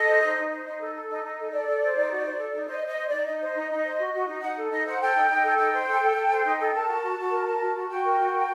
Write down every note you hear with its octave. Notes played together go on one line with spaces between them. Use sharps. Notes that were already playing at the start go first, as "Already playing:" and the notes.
Already playing: A4 D#5
C5
D#4
D#4
C5
D#4
A4
A4
D#4
D#4
A4
A4 D5
A4
C5
D#4
F#4
C5
A4
D#4
C5 D#5
C5 D#5
C5
D#4 D5
D#4 D#5
C5
D#4
D#4
C5
F#4
F#4
D#4
D#4 F#5
A4
D#4 D#5
C5 F#5
A4 G5
D#4
D#4
A4
D#4 G5
C5
A4
A4
A4
C5
D#4
A4
A#4 A5
F#4
F#4
F#4
A#4
A#4
F#4
F#4
F#4 G5
A#4
F#4
A#4